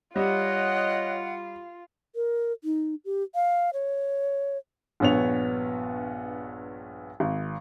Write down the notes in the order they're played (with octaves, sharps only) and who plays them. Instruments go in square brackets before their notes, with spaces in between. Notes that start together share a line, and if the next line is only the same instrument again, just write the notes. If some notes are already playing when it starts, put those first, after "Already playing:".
[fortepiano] G3 [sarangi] F4 [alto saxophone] C#5 [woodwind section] D#5 F#5
[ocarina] A#4
D#4
G4
F5
C#5
[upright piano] A#1 G2 B3 C#5 F7
G#1